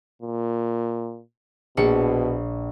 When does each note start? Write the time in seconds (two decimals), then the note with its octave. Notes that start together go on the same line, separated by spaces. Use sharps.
0.22 A#2
1.77 A#1 B2 C#7